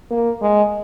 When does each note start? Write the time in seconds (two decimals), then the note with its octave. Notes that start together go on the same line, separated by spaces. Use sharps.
0.11 A#3
0.41 G#3